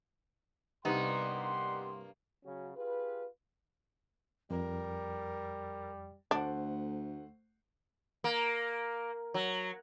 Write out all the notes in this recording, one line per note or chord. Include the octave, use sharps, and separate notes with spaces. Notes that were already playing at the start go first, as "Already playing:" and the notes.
C2 G2 A#3 B3 D#4 G4 F#5 C6
C#3 F#3 C#4 F#4
F4 G4 G#4 B4
F2 G3 A#4
D2 A3 D4 C5 F#5
A#3
F#3